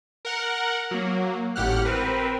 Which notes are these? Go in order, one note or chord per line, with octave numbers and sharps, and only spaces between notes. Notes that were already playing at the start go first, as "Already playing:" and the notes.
A#4 F#5
F#3 A#3
G#1 A2 G4 F#5 F6 F#6
C4 A#4 B4